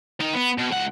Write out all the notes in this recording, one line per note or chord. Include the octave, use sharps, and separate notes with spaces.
D#3 D#4
B3
B2
C#2 F#5